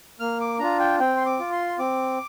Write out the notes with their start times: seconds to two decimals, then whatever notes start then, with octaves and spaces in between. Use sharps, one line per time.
0.20 A#3 F6
0.40 D6
0.59 D4 F4 A#5
0.79 G5
0.99 C4 G5
1.17 C6
1.26 D6
1.39 F4
1.52 C6
1.79 C4 D6